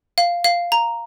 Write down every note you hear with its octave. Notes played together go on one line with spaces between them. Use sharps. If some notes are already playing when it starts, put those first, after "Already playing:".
F5
F5
A#5